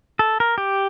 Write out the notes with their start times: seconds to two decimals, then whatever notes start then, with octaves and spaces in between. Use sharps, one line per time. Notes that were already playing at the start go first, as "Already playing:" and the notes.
0.19 A4
0.40 A#4
0.58 G4